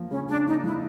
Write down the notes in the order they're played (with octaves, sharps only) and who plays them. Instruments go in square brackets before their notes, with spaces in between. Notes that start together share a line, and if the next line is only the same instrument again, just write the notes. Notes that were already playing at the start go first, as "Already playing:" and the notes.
Already playing: [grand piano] F3 A#3
[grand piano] C#3 [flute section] C#4
[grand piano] C#3 [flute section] D4
[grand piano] A#3 [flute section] D#4
[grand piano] F3 [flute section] E4